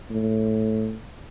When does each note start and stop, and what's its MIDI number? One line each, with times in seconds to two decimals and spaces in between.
0.10 0.96 45